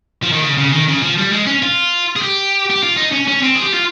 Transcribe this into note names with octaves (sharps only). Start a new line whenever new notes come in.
F3
D#3
C#3
C#3
D#3
C#3
F3
G3
G#3
C#4
F4
G#4
G4
G4
F4
D#4
C#4
C#4
C4
G#4
G4
F4